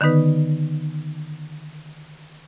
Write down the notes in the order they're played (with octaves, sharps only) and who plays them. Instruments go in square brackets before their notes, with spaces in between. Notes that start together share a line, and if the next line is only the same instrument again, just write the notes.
[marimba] D3 D#3 B3 D#4 B4